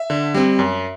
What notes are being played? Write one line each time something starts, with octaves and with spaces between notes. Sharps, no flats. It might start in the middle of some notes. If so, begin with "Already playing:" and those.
Already playing: E5
D3
G3 C4
F#2